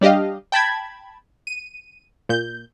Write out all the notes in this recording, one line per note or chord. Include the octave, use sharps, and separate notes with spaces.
G3 D4 G4 D#5 F5
G5 A5 B5 G#6
D#7
A#2 G6